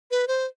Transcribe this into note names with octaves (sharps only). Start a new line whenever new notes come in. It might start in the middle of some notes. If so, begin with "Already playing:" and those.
B4
C5